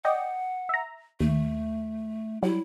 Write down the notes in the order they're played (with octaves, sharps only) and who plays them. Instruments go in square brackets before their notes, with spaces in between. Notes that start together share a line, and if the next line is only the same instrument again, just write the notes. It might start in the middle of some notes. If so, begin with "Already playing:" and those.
[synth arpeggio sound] D5 D#5 G5 [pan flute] F#5
[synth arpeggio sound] E5 A#5
[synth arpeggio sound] D#2 [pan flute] A3
[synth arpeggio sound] F#3 G3 [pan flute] E4